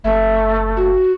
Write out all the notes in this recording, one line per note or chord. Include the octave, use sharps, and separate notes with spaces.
F#1 A3 E5
F#4